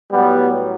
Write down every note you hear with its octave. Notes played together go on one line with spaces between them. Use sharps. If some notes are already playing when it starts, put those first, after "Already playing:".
A2 F#3 G3 B3